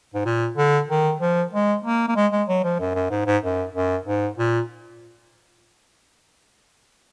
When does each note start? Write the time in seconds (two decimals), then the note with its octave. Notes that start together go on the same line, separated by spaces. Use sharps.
0.14 G#2
0.25 A#2
0.57 D3
0.89 D#3
1.21 F3
1.53 G#3
1.85 A#3
2.08 A#3
2.16 G#3
2.32 G#3
2.48 F#3
2.64 F3
2.79 F#2
2.94 F#2
3.10 G#2
3.26 G#2
3.43 F#2
3.74 F#2
4.06 G#2
4.38 A#2